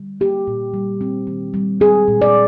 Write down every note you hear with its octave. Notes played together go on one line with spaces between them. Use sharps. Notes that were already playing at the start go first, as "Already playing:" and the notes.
Already playing: D3 G3
A#3 G4
A#2
G3
C4
D#3
G3
C4 G#4
A#2
D5